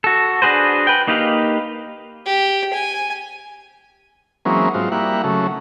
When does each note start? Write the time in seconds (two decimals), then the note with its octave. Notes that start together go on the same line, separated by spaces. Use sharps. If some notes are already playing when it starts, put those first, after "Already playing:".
0.04 F#4 A4
0.42 D4 F#4 G#4 B4 C5
0.87 B4 G5
1.07 A#3 D#4 G4 B4 F5
2.26 G4
2.73 G#5
4.45 E3 F#3 G#3 A#3 C4 C#4
4.74 G#2 F#3 C4 F4
4.92 G3 A#3 E4 F#5
5.24 C#3 F#3 A3